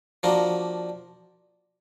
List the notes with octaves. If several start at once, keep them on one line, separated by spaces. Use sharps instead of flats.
F3 A#3 D4 F#4 A#4